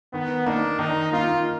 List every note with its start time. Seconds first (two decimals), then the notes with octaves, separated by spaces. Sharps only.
0.13 D#3 B3
0.46 A#3 D4 D#4
0.79 D#3 D#4
1.12 A#3 D#4 F4